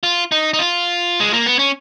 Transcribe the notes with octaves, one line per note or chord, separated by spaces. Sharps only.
F4
D#4
D#4
F4
G#3
A#3
B3
C#4